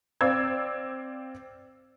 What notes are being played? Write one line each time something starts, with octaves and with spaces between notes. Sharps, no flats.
C4 D5 F5 E6 G#6